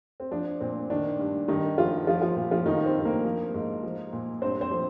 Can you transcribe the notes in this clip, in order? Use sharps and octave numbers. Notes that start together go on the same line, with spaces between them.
C4
F3 D4
A#2 C4
D#3 D4
G2
G2 D#3 D#4
F3 F4
F3 F4
F3 F4
A#2
F3 F4
D#3 F3 D#4
C4
G2
A#3 A#4
F3
G#2
F3
A#2
G2 C4 C5
C4 C5
F3